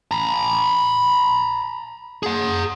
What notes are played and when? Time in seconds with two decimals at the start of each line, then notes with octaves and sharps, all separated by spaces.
0.11 A#5 B5
2.23 G#4 F#5